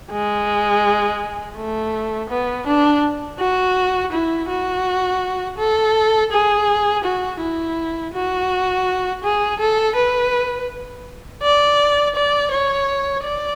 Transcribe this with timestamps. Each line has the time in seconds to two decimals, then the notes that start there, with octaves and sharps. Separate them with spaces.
0.12 G#3
1.57 A3
2.30 B3
2.67 D4
3.39 F#4
4.12 E4
4.49 F#4
5.58 A4
6.32 G#4
7.04 F#4
7.41 E4
8.13 F#4
9.23 G#4
9.59 A4
9.95 B4
11.42 D5
12.15 D5
12.51 C#5
13.24 D5